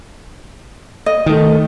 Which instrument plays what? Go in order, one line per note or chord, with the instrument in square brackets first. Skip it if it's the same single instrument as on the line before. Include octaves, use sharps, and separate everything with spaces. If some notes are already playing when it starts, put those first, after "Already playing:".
[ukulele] D#5
[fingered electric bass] D#3 A3